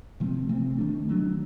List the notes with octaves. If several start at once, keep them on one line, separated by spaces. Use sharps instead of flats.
C3 F3 A3 C4
C3 F3 A3 C4
F#3 A3 D4
D#3
D#3 F#3 A3 D4